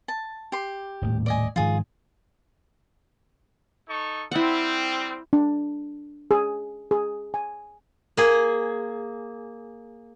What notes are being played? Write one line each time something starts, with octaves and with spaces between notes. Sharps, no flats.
A5
G4 C6
D#1 A2
D5 D#5 G#5
G#2 D#3 F3 F4 G#4
D#4 A4 C#6
G3 C4 E4 F#5
D4
G#4
G#4
G#5
A#3 G#4